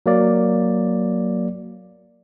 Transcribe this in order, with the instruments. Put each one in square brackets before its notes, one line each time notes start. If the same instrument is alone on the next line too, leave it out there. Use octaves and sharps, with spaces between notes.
[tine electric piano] F#3 A#3 D5